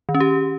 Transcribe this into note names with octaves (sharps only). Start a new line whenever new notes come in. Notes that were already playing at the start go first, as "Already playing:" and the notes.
D#3
C#4
G4